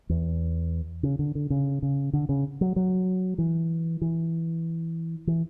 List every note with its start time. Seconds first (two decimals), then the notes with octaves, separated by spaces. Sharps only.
0.09 E2
1.03 C#3
1.19 D3
1.35 D3
1.50 C#3
1.82 C#3
2.13 D3
2.29 C#3
2.61 F#3
2.76 F#3
3.38 E3
4.01 E3
5.27 E3